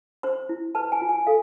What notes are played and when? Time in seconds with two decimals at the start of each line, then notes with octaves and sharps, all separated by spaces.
0.23 C5 C6
0.49 E4
0.75 B4 A5
0.92 G#5
1.02 F4
1.09 G#5
1.27 A4 F5